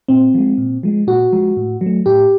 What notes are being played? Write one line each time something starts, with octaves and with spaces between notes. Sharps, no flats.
A#2 C4
F3 G#3
A#2
F3 G#3
A#2 F#4
F3 G#3
A2
F#3
A3
A2 G4